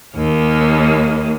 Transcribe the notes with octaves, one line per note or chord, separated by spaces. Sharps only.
D#2 A#3